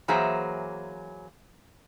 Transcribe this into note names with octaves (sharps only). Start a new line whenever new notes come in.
E3 F#3 A#3 G#4 C5 E5